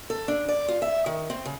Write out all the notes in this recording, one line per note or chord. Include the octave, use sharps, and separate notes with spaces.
A4
D4
D5
F4
E5
D#3
C4
C#3